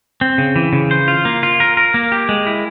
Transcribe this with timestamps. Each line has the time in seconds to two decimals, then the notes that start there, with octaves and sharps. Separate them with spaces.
0.21 C4
0.38 C#3
0.56 E3
0.73 C#3
0.91 C5
1.08 F4
1.25 A#3
1.43 F4
1.60 A#4
1.77 A#4
1.94 A#3
2.12 G4
2.29 G#3
2.47 E4